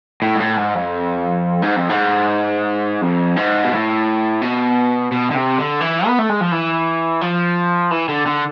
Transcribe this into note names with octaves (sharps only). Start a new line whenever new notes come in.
A2
G#2
A2
G#2
F2
G#2
F2
G#2
F2
G#2
B2
A2
B2
B2
D3
C3
D3
E3
B3
A3
G#3
F3
E3
F3
E3
D3
D3